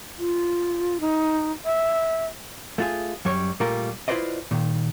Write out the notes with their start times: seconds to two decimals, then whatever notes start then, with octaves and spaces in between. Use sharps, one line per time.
0.19 F4
1.01 D#4
1.65 E5
2.78 A3 F4 G#4
3.25 F#2 G3 C#5
3.60 A#2 G3 A3 A#3 F4 A#4
4.08 E4 F4 B4 C5 D5 D#5
4.51 A#2 D#3